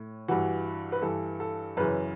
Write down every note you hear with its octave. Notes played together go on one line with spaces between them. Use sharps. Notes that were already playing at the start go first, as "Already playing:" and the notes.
Already playing: A2
G2 E3 F#4
B4
G2 E3 A4
A4
F#2 C#3 E3 B4